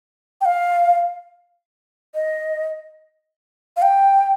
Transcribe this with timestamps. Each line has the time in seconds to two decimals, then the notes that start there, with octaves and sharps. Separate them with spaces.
0.41 G5
0.45 F5
2.15 D#5
3.77 F5
3.82 G5